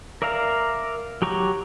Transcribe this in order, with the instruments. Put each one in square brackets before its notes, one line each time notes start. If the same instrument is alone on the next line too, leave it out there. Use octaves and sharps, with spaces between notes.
[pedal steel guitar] A#4 D5 E5 F5 A#5
F#3 G4 A#5 C#6